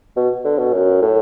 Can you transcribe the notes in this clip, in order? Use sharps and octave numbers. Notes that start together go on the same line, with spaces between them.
B2
D3
B2
F#2
A2